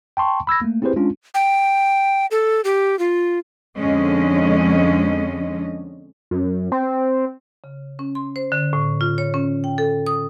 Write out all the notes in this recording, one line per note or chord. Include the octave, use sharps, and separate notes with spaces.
G5 A5 C6 C#6
B5 E6 G#6 A#6
A3 A#3
C4 E4 G4 G#4 B4 C5
G#3 C#4 D4 F4
G5
A4
G4
F4
F2 D3 G#3 C#4 D#5
F#2
C4
C#3
C#4
C6
C5
D3
A2
F4
C#5
C#4
G5
A4
D#6